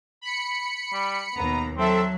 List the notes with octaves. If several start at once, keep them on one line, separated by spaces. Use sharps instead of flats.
B5 C#7
G3
D#2 B2 B3 A#5
F#3 C4 A4 E5